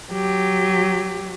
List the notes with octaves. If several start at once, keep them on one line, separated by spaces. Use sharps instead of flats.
F#3 G4